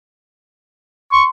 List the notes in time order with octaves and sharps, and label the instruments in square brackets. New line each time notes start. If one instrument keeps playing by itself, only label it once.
[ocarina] C6 [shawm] C#6